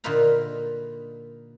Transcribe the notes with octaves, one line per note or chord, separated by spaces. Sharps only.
A#2 D3 D#4 F4 B4 A#5